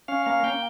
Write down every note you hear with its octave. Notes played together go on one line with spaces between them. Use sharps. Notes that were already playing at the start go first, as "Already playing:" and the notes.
C#4 F5
A#3 F5
A#3 G5